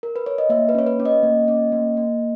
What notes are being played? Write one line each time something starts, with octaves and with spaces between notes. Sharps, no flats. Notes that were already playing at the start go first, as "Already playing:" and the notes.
A#4
B4
C#5
D#5
A#3 E5
B4
C#4 C#5
B4
C#4
D#5
A#3
C#4
A#3
A#3